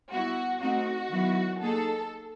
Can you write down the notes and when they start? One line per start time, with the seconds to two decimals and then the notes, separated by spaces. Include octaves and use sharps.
0.11 G3 B3 E4 F#4
0.61 A3 C4 D#4 F#4
1.10 D#3 F#3 B3 E4
1.60 A#3 D#4 G#4 A4